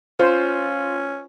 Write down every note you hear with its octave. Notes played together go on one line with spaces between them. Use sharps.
C#4 F4 C5